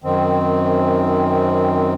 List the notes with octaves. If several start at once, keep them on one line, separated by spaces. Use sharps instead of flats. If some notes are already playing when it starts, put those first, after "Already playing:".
F#2 D#3 C4